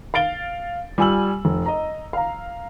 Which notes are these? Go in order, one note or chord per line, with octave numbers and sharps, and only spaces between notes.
F5 A6 D7 G7
G3 F4 G#5 E6 F#7
F1
D#5 A#5
F5 A#5